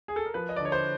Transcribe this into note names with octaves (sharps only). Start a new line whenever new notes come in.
G#4
A4
A#4
F3 B4
D#5
D5
D3
C#5
C5